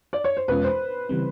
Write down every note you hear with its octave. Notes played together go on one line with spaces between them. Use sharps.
D5
C#5
C5
E2 B2 G#3 C#4 F4 B4
C5
C#3 E3 G3 C4